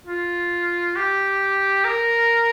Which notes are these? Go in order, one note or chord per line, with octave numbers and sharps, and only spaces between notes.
F4
G4
A#4